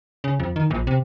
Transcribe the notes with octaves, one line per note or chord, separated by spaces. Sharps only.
C#3
F2
D#3
A#1
C3